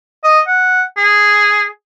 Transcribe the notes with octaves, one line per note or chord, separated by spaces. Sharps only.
D#5
F#5
G#4